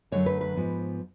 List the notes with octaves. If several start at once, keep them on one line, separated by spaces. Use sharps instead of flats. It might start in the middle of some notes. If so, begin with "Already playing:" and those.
F#2 D3 F#3 A3 C#5
B4
B4
G#2 F3 B3